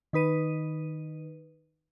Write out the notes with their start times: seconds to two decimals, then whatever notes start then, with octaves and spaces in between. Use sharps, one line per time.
0.13 D#3 D#4 B4 D#7